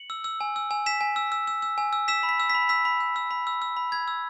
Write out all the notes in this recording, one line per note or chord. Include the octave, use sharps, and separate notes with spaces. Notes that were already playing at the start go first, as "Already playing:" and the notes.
Already playing: C#7 F#7
E6
E6
G#5
E6
G#5
G#5 B6 E7
G#5
E6
E6
E6
E6
G#5
E6
E6 B6 E7
B5
B6
E6
B6
B5
E6 B6
B5
E6
E6
B5
E6
E6
B5
B5 G#6
E6